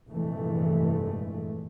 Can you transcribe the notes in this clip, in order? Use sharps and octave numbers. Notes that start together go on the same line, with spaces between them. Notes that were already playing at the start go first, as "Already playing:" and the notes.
F1 G2 A#2 E3 G#3 A3